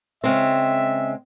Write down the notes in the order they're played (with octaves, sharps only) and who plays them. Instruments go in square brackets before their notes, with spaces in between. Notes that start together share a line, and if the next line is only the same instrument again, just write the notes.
[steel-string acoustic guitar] C#3 G#3 C4 [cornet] E5